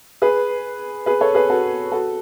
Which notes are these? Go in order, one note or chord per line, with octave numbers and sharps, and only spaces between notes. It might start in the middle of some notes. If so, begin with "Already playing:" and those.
G#4 B4
G#4 B4
A4 C#5
G#4 B4
F#4 A4
F#4 A4